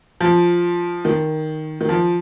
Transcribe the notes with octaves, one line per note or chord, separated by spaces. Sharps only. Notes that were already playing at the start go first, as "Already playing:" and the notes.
F3
D#3
D#3
F3